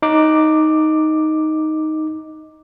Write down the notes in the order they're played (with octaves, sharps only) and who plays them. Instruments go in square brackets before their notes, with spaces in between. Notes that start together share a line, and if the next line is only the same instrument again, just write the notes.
[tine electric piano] D#4 D6